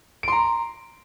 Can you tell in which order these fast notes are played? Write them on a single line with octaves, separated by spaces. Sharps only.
D7 C6 A#5